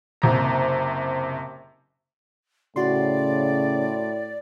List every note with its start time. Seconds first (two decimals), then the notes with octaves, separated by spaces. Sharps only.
0.22 F#1 C3 A#5
2.76 A2 C#3 F#4 D5 C6